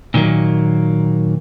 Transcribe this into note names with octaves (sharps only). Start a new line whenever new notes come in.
A#2 D#3 F#3 A#3